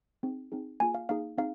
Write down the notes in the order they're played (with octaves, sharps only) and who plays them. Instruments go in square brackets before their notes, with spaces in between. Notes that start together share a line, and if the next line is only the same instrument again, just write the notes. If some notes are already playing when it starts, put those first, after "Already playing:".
[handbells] C4 D#4 G#4
C4 D#4 G#4
A#3 F4 G#4 G#5
F5
A#3 D#4 G#4 F5
C4 D#4 G#4 F5